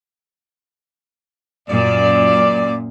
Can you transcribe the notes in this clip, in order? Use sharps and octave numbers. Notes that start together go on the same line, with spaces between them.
F#2 A#2 D5